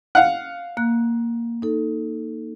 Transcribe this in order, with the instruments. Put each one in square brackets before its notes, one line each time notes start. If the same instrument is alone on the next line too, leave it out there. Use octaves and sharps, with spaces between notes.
[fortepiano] F5 F#5
[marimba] A#3 F#6
D#4 A4